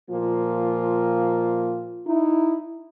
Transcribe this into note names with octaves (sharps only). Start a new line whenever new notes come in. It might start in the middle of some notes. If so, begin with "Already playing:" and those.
A#2 F3 A#3 F4
D#4 E4